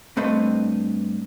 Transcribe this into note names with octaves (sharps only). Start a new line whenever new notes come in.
G2 A3 C4 B4 D#5